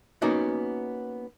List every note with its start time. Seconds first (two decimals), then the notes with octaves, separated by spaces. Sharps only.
0.22 A#3 B3 C#4 D#4 F#4